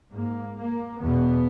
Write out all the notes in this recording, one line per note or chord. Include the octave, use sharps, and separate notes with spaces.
G#2 A#3
A#3
E2 B2 B3